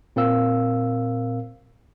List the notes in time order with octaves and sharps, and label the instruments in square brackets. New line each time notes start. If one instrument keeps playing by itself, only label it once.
[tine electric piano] A#2 C4 A#4 F5 E6